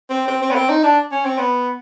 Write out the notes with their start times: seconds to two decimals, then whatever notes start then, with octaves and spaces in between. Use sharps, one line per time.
0.10 C4
0.28 C4
0.42 C4
0.51 B3
0.55 C4
0.69 D#4
0.83 D4
1.12 C#4
1.25 C4
1.38 B3